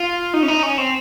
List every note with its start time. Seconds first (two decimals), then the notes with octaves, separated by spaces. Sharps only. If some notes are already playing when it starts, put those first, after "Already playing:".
Already playing: F4
0.34 D#4
0.43 C#4
0.48 D#4
0.63 C#4
0.78 C4